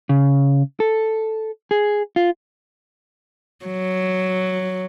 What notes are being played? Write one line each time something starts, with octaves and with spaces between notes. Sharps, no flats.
C#3
A4
G#4
F4
F#3